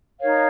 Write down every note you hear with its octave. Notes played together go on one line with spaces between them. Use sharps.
D#4 A#4 C#5 F5